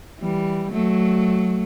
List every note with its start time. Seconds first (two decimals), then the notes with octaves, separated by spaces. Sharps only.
0.20 E3 G3
0.72 F#3 A3